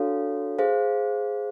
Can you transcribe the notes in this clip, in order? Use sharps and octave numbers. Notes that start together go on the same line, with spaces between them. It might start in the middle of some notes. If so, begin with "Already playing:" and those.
Already playing: D4 F#4 A4 C#5 F5
G#4 C5 F5